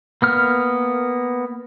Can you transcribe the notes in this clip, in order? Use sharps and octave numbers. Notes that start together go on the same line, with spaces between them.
A#3 B3 F6